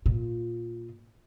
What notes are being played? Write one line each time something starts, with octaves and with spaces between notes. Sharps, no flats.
A#2 F4